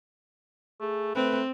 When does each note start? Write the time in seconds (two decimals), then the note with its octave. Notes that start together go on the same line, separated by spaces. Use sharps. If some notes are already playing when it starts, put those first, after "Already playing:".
0.81 A3 G#4
1.16 A3 C4 B4